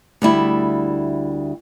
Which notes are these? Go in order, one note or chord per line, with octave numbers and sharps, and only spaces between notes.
D2 G3 E4